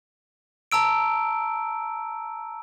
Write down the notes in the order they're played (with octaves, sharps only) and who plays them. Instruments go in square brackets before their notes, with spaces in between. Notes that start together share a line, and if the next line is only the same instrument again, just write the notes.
[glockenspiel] A5 A#5 E6 D7